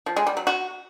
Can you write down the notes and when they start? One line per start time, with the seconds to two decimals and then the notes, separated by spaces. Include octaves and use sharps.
0.06 F3
0.16 G#3
0.27 G3
0.37 F#3
0.47 F#4